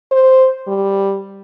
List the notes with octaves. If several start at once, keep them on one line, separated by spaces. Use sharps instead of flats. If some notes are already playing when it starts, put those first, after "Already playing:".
C5
G3